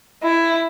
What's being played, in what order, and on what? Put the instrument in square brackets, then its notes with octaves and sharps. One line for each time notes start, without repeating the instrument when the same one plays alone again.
[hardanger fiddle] E4